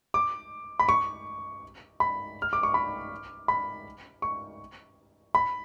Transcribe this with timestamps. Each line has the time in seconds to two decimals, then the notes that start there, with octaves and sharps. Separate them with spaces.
0.14 D6
0.80 B5
0.89 C#6
2.00 B5
2.42 F6
2.53 D6
2.63 C#6
2.74 B5
3.48 B5
4.22 C#6
5.35 B5